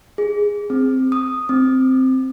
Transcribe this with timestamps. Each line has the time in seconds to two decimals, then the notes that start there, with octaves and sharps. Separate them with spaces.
0.18 G#4
0.70 C4
1.12 D#6
1.49 C4